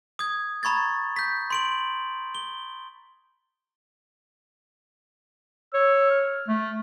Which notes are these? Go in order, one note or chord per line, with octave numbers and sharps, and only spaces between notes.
D#6 G#6
A#5 B5 C#6 G#6 A6
G6 B6
C6 D7 F#7
G7
C#5 E6
F6
A3